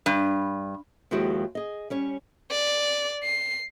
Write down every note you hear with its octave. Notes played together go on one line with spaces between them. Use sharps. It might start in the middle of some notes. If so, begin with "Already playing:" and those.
G2
D#2 F3 G#3 E4 F#4 G4
G#4 D#5
G3 C#4 C#5
D5
C7